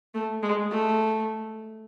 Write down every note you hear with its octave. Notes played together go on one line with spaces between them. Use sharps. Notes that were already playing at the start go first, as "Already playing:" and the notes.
A3
G#3
A3